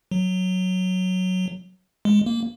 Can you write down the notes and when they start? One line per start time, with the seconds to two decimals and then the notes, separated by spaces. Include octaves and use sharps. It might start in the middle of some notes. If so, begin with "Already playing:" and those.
0.11 F#3
2.05 G#3
2.26 A#3